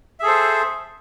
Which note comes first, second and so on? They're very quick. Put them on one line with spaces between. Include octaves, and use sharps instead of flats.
E5 G#4 A4 C5